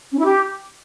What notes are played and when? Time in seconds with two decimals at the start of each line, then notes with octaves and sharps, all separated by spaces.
0.12 C#4
0.18 E4
0.25 G4